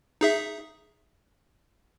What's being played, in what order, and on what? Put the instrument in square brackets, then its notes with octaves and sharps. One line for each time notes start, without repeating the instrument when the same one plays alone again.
[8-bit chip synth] D#4 G#4 E5